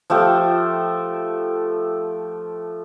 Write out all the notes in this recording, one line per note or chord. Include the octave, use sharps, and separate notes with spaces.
F3 A3 G4